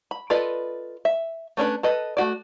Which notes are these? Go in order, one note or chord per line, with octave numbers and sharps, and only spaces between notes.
B5
F4 A4 B4 D5 D#5
E5
A3 C#4 D4 B4
A4 B4 D#5
A3 F#4 D5